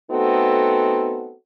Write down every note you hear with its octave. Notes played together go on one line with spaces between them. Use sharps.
A3 B3 C4 D#4 F#4 A4